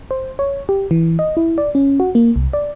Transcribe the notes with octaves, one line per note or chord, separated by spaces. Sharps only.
C5
C#5
G4
E3
D#5
E4
D5
C#4
F#4
A#3
C2
D5